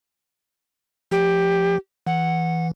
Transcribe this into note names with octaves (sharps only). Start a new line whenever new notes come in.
F3 G4
E3 F#5